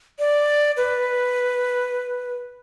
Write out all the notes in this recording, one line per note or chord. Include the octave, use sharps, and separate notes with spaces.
D5
B4